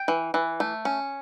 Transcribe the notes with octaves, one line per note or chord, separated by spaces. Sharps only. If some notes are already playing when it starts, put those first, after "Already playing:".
Already playing: G5
E3
E3
A3
C#4